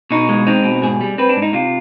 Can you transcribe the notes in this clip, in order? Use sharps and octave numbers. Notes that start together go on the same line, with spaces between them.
B2 D#4
G#3
C4 D#4
B2
G#2 G#4
G3
C4 B4
D4
G#2
D#4
C3 F4